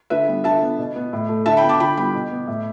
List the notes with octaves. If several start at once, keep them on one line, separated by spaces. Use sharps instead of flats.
D3 B4 E5
G3 B3
D3 E5 A5
B3
B2
B3
A2
A3
D3 E5 A5
G5 B5
B3
A5 D6
D3 G5 B5
G3 B3 G5 B5
B2
B3
A2